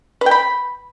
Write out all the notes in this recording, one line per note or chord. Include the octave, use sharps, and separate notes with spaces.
B4
G5
B5